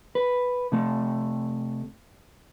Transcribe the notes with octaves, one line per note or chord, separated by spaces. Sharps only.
B4
C3 A3